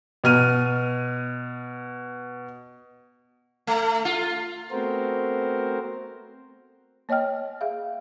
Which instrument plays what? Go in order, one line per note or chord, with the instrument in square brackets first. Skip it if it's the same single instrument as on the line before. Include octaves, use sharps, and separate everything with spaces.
[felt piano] B2 F6 D#7
[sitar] A3
F4
[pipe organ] A3 B3 C4 F#4 A#4 C5
[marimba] A#3 C#5 D#5 G5 F6
G#4 E5 F5